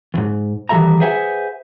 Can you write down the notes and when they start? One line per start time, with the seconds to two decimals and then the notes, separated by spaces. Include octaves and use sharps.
0.14 D#2 G#2
0.69 D#3 E3 G3 A4 E5 A#5
1.00 G#4 B4 C5 E5 F#5 G#5